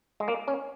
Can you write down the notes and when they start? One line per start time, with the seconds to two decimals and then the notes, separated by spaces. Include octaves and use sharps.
0.20 G#3
0.28 A#3
0.48 C#4